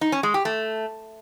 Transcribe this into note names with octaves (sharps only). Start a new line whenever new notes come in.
D#4
C#4
G#3
G4
A3